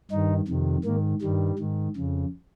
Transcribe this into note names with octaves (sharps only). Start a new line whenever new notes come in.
G2 D#3 D#4
F2 C3 D#3
G#2 D#3 A#3
G2 D#3 G3
G#2 D#3
F2 C#3